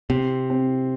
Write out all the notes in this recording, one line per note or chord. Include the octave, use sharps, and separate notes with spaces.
C3 C4
C4